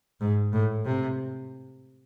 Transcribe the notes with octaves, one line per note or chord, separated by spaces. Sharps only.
G#2
A2
C3